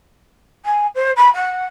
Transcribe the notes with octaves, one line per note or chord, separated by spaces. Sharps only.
G#5
C5
B5
F#5